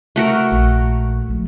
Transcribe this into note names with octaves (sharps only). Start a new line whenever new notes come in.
A3 F#4 A#4
A#1
F3 A3